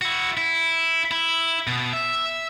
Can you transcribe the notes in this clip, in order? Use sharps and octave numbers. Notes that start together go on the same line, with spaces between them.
E4 F#4
E4
E4
B2
E5